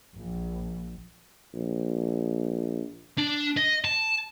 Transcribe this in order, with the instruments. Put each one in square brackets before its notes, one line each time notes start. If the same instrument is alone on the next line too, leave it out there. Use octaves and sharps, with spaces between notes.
[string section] A#1
[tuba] A#1
[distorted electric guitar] D4
D#5
A5